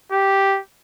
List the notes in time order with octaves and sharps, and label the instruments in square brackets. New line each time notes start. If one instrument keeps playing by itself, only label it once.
[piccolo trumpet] G4